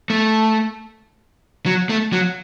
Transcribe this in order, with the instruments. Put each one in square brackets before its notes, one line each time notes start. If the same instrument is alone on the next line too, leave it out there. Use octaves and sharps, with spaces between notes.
[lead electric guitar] A3
F#3
A3
F#3